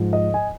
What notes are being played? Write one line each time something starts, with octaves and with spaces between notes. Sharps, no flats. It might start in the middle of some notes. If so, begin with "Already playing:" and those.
Already playing: G#2 F3
D#5
G#5